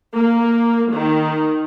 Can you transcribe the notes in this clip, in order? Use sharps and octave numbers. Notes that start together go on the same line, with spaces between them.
A#3
D#3